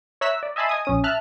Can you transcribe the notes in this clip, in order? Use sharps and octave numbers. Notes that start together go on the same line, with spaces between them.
C#5 E5 A#5 E6 F#6 B6
D5
D#5 E5 G#5 A5 B5 C6
D#5 G#5 D#6
A#1 C#4 D#6
E5 A5 F6 F#6